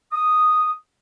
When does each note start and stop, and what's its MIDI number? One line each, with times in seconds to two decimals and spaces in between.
0.13 0.72 87